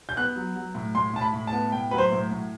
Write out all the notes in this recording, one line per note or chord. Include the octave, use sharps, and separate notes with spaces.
G6
B3 F#6
F#3
F#3
A2
A2 C6
A2 A5
B5
A2
A5
B3
A2 G5
F#3 B4
C5
A2
A2